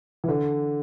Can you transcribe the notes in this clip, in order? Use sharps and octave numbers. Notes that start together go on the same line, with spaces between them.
E3
D3